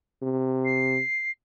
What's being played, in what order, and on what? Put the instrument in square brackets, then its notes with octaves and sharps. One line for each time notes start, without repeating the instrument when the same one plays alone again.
[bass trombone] C3
[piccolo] C7